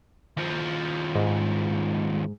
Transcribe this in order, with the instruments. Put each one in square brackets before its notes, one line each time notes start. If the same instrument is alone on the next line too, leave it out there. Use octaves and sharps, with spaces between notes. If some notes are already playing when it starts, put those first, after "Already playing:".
[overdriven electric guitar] D#2 F3
[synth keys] G#2